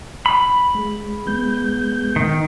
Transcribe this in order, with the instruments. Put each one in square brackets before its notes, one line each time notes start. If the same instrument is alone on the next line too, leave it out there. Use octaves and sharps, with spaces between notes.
[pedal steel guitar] B5
[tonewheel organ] G#3
G#3 B3 G6
[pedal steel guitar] D#3